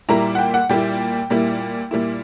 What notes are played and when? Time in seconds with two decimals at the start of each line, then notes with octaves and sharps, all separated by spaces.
0.09 A#2 G3 A#3 E4 A#5
0.35 F#5
0.39 G5
0.54 F#5
0.69 A#2 G3 A#3 E4 G5
1.30 A#2 G3 A#3 E4
1.91 A#2 G3 A#3 E4